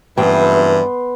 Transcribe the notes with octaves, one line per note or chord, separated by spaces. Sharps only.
F#1 G2 E3 B3 E5 G5 C6